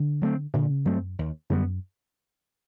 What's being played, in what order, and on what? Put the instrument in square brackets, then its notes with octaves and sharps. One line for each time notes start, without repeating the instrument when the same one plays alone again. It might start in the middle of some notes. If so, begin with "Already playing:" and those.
Already playing: [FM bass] D3
[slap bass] F#3 A3 C4
[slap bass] A#2 [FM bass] D3
[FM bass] C#3
[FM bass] G2 [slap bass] F#3 A3 C4
[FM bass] F#2
[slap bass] D#2
[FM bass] F#2 [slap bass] D3 G3 B3